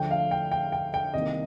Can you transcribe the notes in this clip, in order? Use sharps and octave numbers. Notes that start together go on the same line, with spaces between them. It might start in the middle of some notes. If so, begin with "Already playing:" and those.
Already playing: D2 D3 F3 A3 G5
F5
G5
G5
G5
G5
C2 C3 D#3 A#3 D#5